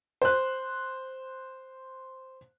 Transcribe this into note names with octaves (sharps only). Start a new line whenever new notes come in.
C5 F#6